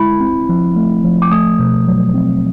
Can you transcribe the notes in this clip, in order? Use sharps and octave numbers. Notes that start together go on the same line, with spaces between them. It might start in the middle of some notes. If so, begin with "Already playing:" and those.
Already playing: G#3 E4 B5
C4
F3
A3
F3
D6
A3 D#6
B2
F#3
C4